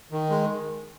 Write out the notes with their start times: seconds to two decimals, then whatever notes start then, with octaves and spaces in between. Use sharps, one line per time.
0.12 D#3
0.30 G#3